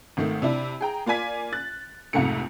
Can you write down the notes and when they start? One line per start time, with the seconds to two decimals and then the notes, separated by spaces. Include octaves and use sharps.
0.17 G#1 D#3 A3
0.42 C3 D4 E4
0.81 G#4 G5 A#5
1.06 A#3 F4 D5 G#5 B6
1.53 F#6 A6
2.13 C2 F2 G#2 C3 A3 C#7